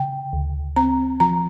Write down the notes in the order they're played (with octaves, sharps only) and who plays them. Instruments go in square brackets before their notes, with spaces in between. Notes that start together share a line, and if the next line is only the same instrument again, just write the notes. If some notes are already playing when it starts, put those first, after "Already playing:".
Already playing: [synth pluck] C#3 [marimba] G5
[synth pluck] D2
[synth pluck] C4 [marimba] A#5
[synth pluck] F3 [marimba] A#5